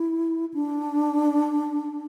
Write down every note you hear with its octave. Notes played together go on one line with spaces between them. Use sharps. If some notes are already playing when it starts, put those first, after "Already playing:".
Already playing: E4
D4